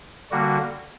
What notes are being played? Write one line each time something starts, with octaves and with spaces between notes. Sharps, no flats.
D3 G3 A#3 F#4